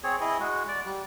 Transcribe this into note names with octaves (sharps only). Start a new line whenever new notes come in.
C4 G#4 C#5
E4 G#4 D#5
G#3 F#4
D5
G3